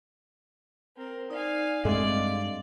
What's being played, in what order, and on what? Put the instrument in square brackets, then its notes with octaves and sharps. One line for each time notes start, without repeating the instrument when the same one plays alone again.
[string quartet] C4 A#4
[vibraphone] D#4 D5 [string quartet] F5 G#5
[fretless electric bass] G2 G#3 A3 [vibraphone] C4 D#5 F5 [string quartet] D5